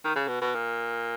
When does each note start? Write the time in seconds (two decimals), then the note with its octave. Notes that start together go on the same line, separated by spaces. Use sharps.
0.04 D#3
0.16 C#3
0.28 B2
0.41 B2
0.55 A#2